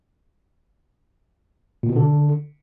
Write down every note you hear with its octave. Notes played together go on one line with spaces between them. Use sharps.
A#2
B2
D3